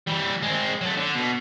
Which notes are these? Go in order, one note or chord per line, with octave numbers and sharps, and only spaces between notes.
E3 G3
G#3 C4
F#3 A3
D3
B2